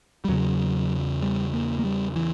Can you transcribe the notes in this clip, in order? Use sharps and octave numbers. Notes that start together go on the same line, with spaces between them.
G3
E2 C#3 F#3
G3
A#3
A#3
G3
E3